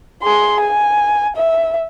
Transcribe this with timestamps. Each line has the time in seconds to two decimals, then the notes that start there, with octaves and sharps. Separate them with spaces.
0.23 G#4 C6
0.61 G#5
1.37 E5